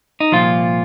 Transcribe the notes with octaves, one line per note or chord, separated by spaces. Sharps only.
D#4
C2 A#2 F3 F4